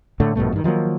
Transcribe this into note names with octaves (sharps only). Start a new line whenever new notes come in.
A2 D3 A3
A#1 G2 B2 A3
G2 D#3
D#3 F3 F#3 A#3